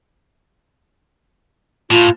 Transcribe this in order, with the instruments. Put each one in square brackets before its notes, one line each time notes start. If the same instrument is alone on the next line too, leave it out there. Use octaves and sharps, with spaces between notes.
[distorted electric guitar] A2 [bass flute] F4